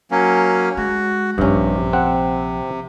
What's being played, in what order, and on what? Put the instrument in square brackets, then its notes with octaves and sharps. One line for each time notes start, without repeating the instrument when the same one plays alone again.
[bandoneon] F#3 A#3 C#4
[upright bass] G#3 [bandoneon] F#4
[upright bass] A#1 F3 [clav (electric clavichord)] G2 C#4 [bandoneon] C3
[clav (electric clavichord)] C4 F#5